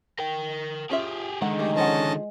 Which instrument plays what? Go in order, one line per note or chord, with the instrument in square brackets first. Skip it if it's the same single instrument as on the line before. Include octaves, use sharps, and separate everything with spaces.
[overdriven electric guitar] A#4 G5
[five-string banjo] C#4 F4 E5 [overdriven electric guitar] G4 G#4
[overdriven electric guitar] D3 D#3 [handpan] G#3 [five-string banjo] F#5
[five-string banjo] A3 G#4 [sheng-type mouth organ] G4
[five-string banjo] F3 G#4 F#5 [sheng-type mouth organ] C#4 D#5 A5